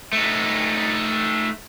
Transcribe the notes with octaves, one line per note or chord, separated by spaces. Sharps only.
A3 D#4